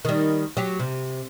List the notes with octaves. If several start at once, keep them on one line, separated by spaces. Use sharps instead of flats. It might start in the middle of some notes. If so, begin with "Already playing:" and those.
D#3 G3
F#3 G4
C3